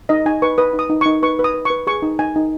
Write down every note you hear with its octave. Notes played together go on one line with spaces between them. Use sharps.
D#4 D#5
D#4 G#5
B4 C#6
B4 D#6
D#4
D#6
D#4
C#6
D#4
B4 C#6
B4
D#6
B4
C#6
B4
G#4 C#6
D#4
D#4 G#5
D#4